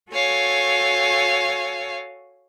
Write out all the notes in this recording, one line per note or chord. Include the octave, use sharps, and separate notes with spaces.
F#4 A4 C#5 F5 G#5